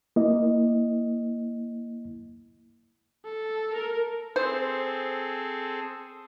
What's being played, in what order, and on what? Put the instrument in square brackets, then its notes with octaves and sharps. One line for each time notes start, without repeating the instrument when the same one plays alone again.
[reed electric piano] A#3 E4 D#5
[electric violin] A4
[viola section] A#4
[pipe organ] C4 G#4 A4 [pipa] C5